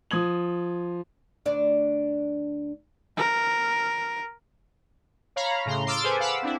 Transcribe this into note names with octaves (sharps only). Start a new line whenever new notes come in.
F3 D#6 G#6 F#7
D2 D4 D5
A#4
C#5 F5 A#5 B5
A2 C#3 A#5 C6
C6 D6 E6 F6 A6 D7
G#4 A4 B4 C5 G#5
F5 F#5 B5 D6 E6
C4 D4 E4